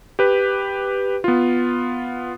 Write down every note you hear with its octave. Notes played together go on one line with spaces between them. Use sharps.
G4 B4
B3 F4